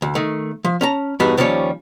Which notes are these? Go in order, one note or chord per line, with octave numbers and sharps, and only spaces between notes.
D2
D#3 A3
F3
C#4 A5 A#5
E2 G2 B3 D#4 F#4 B5
D#2 F3 G3 C#4 C#5